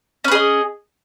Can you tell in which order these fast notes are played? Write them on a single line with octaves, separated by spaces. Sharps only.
C#4 B4 G#4 D#5